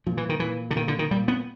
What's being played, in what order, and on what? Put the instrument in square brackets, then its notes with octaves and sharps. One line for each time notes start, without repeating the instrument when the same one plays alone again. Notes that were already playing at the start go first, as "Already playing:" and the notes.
[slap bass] A#2 F3
E3
D#3
A#2 E3
D3
A#2 D#3
D3
D#3
A#2 G3
B3